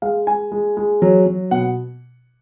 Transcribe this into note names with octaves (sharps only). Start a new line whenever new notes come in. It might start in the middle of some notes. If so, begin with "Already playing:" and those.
G#3 F5
G#3 G#5
G#3
G#3
F#3
F#3
B2 F#5